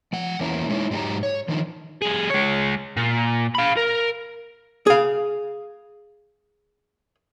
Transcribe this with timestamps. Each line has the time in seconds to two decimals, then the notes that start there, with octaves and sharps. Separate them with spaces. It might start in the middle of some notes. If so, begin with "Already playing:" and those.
0.13 F3 F#5
0.39 E2 A#3 C#4 E4 A5 A#5
0.69 G#3 D#4 E4 C#5
0.91 G#2 F#3 D4 D#4 G4 A#5
1.23 C#5
1.48 D#3 F3 D4 D#4
2.02 G3 G#4
2.30 G#3 C#5
2.97 A#2
3.55 F5 B5
3.77 A#4
4.87 G#4 F5